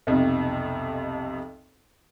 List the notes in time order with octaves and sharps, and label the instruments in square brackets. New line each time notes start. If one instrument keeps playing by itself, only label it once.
[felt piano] B1 F2 C3